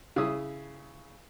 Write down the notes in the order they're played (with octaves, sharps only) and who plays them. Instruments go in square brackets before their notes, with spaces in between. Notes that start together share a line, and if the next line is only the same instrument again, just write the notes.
[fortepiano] C#3 E4 D#6